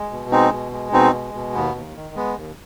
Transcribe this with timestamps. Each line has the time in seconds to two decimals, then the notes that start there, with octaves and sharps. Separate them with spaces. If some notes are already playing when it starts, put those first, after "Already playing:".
Already playing: G#3
0.11 B2
0.31 G#3 C4 D#4
0.52 B2
0.72 G#3
0.92 B2 C4 D#4
1.13 G#3
1.34 B2
1.54 D#2 B3
1.75 D#2
1.95 D#3
2.16 G#3 B3
2.36 D#2